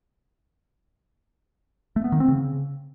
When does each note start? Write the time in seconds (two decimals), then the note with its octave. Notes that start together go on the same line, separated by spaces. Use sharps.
1.96 A3
2.04 B3
2.12 D#3
2.20 C4
2.28 C#3